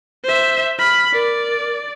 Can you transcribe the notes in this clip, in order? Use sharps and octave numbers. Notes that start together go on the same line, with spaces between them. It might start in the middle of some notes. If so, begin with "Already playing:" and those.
C5 E5
B5 F6
A#4 D5